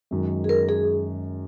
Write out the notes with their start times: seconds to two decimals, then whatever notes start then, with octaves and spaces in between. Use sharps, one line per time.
0.11 F#2 D#3 G#3
0.44 G#4
0.49 A#4
0.69 G#4